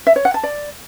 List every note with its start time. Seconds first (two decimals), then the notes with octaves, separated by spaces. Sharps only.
0.07 E5
0.16 C#5
0.25 F#5
0.34 A5
0.43 D5